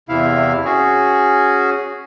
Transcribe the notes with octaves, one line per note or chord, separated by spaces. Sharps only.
E2 C3 E4 F5
C#4 F#4 G#4